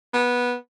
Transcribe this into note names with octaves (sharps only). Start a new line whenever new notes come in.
B3